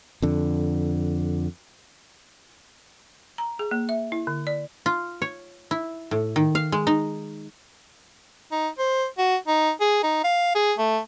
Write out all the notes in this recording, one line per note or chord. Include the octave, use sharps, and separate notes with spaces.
F2 D3
A#5
G#4
A#3
E5
E4
D3
D5
F4
C#5
E4
A2
D#3
F5
G#3
D#4
D#4
C5
F#4
D#4
G#4
D#4
F5
G#4
A3